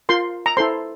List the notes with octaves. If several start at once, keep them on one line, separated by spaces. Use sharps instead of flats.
F4 A#4 C6
A#5
E4 A4 C5 C6